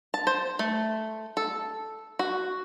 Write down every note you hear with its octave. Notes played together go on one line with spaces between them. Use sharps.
A5
C5
A3
A4
F#4